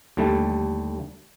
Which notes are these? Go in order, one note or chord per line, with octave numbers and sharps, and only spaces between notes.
D#2 D3 G3 A3